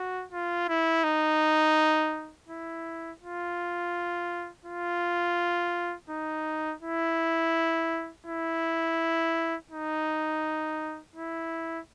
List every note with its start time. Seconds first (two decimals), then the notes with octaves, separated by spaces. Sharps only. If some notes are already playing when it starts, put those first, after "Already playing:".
Already playing: F#4
0.32 F4
0.69 E4
1.04 D#4
2.48 E4
3.21 F4
4.65 F4
6.10 D#4
6.82 E4
8.26 E4
9.71 D#4
11.16 E4